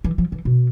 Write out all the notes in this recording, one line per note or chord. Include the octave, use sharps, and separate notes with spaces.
E3
F3
E3
B2